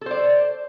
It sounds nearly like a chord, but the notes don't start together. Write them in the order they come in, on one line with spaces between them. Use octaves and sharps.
A4 C5 D5